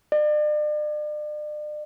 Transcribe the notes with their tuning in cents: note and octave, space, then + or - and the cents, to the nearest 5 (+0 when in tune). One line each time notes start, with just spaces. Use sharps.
D5 +40